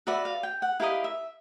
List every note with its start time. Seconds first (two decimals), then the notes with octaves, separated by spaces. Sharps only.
0.07 F#4 B4 D5 E5
0.25 F5
0.43 G5
0.62 F#5
0.80 E4 G4 A#4 D#5 F5
1.04 E5